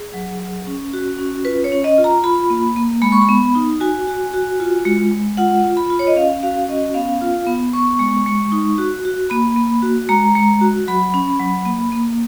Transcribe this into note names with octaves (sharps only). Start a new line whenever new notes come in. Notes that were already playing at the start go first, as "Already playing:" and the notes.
Already playing: G#4
F#3
F#3
C#4
F#4
C#4
F4 B4
C#5
C#4
D#5
F4
A#5
F4 B5
A#3
A#3
G#3 B5
C#6
B5
B3
D#4
F#4 G#5
F#4
F#4
F4
G#3
G#3
F4 F#5
F4
B5
F4
C#5
D#5
C#4 F5
F#4 F5
C#4 D#5
B3 F5
F4
B3
B3 C#6
G#3
G#3
D#4
F#4
F#4
A#3 B5
A#3
F#4
G#3 A#5
G#3
F#4
F#3 B5
C#4
F#3
A#3
A#3